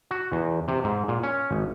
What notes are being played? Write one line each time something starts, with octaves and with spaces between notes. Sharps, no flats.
F#4
E2
C3
G#2
A#2
C#4
G#1